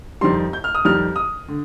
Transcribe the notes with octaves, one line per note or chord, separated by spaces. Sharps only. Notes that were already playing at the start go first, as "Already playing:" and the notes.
F2 D#3 G3 C6
G6
F6
D#6
F2 D#3 G3 F6
D#6
D3